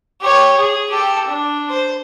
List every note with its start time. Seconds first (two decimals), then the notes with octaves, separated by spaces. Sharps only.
0.21 G4 C#5
0.56 G#4
0.90 G4 A4
1.28 D4
1.70 C5